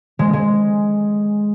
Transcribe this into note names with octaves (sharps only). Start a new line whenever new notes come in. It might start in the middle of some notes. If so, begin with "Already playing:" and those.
G#3
G#3